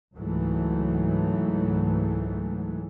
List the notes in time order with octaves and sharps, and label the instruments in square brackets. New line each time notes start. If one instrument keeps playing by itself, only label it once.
[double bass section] C#2 G#2 E3 F#3 A3